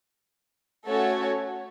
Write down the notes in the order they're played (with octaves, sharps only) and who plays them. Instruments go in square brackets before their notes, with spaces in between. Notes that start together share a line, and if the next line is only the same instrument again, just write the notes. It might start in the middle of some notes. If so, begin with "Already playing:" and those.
[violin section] A3 C#4 F#4 A4 C#5